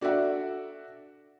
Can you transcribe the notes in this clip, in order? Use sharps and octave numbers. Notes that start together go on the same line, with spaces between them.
D4 F#4 A4 D5 E5 F#5